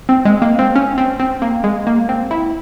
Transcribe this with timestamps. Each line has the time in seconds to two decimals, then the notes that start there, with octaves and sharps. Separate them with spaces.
0.09 C4
0.25 G#3
0.42 A#3
0.59 C4
0.76 C#4
0.98 C4
1.20 C4
1.42 A#3
1.64 G#3
1.87 A#3
2.09 C4
2.31 E4